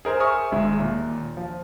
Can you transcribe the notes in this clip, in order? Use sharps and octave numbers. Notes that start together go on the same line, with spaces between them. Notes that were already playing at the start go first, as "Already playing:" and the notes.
G#4 A#4 C5
E5 G#5 C#6 D#6 F6
D#1 G#3 E5
D#2 A#2
F3